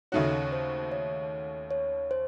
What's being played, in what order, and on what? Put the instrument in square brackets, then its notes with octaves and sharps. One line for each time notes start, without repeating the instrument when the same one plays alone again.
[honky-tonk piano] D#2 C#3 A3 D#4 F#4 [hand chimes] C#5
[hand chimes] C5
C#5
C#5
C5